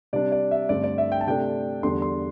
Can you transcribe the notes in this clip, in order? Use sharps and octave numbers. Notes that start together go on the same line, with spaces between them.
C3 G3 D4 D5
D5
E5
G2 D3 A3 C4 D5
D5
E5
G5
A5
C3 A3 D4 G5
E2 D3 G3 D4 C6
C6